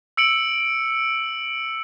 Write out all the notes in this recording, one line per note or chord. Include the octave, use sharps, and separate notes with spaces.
E6 C#7 D7 F#7